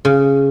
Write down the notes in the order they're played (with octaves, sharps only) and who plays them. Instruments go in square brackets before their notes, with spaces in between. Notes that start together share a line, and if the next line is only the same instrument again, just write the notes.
[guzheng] C#3